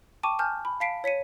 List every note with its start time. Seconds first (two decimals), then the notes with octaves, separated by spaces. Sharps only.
0.23 G5 A5 C#6 D6 D#7
0.39 G#5 A5 F6 G6
0.65 B5
0.80 F5 A5 B6 C7 D7
1.04 C#5 B6 C#7 D#7